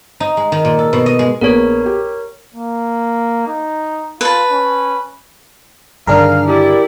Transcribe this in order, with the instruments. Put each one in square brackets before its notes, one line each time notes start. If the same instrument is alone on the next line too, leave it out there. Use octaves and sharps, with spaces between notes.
[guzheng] D#4
G#3
D#3
A#2
A4
B2
D#5
G#3
[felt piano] A#1 B3 G#4 [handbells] A#4 C#5
[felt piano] G4
[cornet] A#3
D#4
[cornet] F4 [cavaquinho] B4 A5
[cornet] C#4
[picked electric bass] G2 D3 D#3 [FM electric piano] D4 G#4 A#4 [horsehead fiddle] F5
[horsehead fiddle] E4 [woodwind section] G4 D5